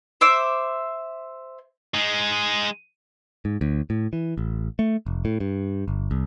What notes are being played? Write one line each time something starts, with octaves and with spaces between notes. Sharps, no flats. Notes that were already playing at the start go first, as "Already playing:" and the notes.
C5 E5 D6
G#3 D#4
G#2
D2
A2
E3
A1
A3
F1
A2
G2
G1
C2